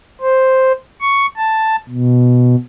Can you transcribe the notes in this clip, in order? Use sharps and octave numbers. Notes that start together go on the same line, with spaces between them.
C5
C#6
A5
B2